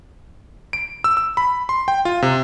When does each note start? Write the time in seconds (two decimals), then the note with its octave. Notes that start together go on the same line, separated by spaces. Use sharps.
0.73 D7
1.04 E6
1.17 E6
1.37 B5
1.69 C6
1.88 G5
2.05 F4
2.22 C3